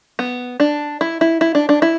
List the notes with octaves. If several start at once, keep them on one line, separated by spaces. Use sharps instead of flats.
B3
D4
E4
E4
E4
D4
D4
E4